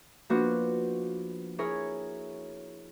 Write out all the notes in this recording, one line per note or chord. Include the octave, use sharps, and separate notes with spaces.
F3 A#3 B3 D4 F#4
E4 G#4 A#4 C#5